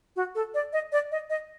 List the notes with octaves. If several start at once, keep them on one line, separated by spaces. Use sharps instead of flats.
F#4
A4
D5
D#5
D5
D#5
D#5